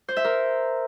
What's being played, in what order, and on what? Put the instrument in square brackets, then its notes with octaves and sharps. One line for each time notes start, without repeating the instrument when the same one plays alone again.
[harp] C5
E5
A#4